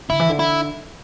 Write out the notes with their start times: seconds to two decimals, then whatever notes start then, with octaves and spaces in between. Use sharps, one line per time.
0.10 D3 E4
0.19 E3
0.29 D3
0.39 E4